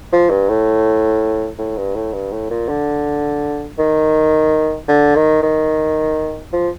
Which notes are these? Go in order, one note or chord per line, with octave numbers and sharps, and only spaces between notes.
F3
G2
A2
A2
G2
A2
G2
A2
A#2
D3
D#3
D3
D#3
D#3
F3